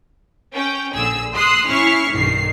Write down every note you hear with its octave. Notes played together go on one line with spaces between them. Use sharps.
C#4 G5
A#1 D3 G#4 E6
C6 D#6 E6 F#6 C7
C#4 E4 C#6 F6 C7
B1 G2 D#3 C7